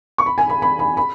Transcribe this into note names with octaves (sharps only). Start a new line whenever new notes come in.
C#6
B5
G#5
B5
B5
B5
B5